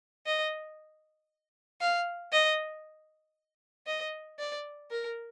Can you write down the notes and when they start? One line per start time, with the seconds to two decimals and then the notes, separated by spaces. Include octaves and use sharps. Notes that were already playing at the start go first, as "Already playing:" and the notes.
0.26 D#5
1.81 F5
2.32 D#5
3.87 D#5
4.39 D5
4.91 A#4